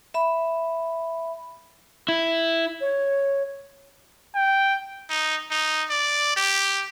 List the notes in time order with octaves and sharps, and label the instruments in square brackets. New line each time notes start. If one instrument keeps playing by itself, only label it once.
[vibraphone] E5 B5
[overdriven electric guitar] E4
[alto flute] C#5
[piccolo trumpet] G5
[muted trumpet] D#4
D#4
D5
G4